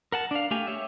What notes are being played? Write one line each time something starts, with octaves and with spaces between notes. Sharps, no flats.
A#4 F#5 A5
D4 F5
A3 G4 F5 G#5
G4 C#5 E5